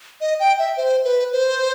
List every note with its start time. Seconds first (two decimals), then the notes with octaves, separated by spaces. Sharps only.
0.21 D#5
0.40 G5
0.59 E5
0.77 C5
1.05 B4
1.32 C5